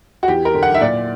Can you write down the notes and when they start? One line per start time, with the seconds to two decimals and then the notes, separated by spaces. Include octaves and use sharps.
0.23 F#4
0.28 E2 G4
0.45 A#4
0.54 D3
0.63 F#5
0.74 E5
0.81 A#2 D5